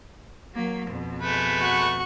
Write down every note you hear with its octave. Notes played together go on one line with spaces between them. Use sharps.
F#3 A#3
F2 B2
G#3 A3 B4
F#4 C#6